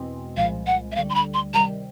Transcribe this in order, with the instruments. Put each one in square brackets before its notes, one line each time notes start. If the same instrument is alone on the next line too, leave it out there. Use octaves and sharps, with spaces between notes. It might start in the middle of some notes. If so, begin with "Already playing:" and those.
Already playing: [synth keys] E2 B2 G#3 C4
[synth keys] C2 A#2 F3 G#3 [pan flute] F5
[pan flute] F#5
E5
[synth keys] D2 D3 G3 [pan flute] F5
[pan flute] C6
B5
C6
[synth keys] C3 D#3 G3 [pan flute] A#5